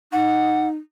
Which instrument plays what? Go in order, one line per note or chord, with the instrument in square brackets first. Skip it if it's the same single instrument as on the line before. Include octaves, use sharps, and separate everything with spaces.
[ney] D#4 [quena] F#5